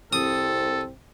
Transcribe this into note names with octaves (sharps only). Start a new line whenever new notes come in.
C2 C4 A4 D#6